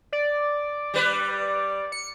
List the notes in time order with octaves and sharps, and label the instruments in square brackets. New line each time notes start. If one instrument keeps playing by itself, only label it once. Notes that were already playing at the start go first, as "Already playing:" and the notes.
[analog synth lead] D5
[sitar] G3 B4
[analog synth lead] C#7